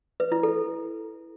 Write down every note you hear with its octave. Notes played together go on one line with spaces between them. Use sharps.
B4
E4
A4